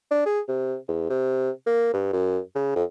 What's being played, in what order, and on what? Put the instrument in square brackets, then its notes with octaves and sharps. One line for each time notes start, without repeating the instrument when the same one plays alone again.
[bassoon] D4
G#4
C3
E2
C3
A#3
G2
F#2
C#3
F2